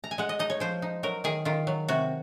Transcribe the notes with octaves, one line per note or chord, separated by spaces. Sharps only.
A#5
G#5
G#3 F#5
D#5
D#4 D#5
C#5
F3 C5
D#4
F#3 A#4
D#3 G#4
D#3 F4
F#3
C3 F#4